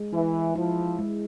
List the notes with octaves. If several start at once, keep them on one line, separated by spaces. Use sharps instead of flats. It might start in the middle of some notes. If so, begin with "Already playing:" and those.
Already playing: G#3
E3 E4
F3 E4
G#3